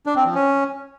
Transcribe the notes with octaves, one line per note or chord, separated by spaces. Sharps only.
D4
C4
F3
C#4